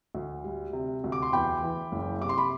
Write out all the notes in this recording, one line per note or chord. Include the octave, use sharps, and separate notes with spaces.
D2
G3
C3
D2
D6
C6
E2 G5 B5
E3
F#1
C3 D6
C6
B5